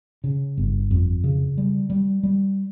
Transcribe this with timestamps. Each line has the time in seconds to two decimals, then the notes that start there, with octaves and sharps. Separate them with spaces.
0.24 C#3
0.57 G1
0.91 F2
1.24 C#3
1.58 G3
1.90 G3
2.23 G3